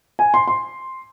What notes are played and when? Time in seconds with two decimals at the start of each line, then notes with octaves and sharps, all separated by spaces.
0.19 G#5
0.34 C6
0.47 C6